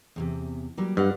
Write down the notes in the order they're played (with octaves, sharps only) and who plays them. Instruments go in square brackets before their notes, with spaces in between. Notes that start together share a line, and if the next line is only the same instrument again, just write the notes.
[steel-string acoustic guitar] E2 A2 C3
F#3 G3 A#3
[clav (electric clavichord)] G2 [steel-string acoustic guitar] D#5 F5 F#5